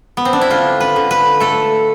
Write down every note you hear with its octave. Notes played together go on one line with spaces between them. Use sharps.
B3
C4
D4
E4
D3 F4
B4
D3
B4
A3 A4